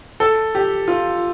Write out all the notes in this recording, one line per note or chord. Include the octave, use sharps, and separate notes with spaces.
A4
G4
F4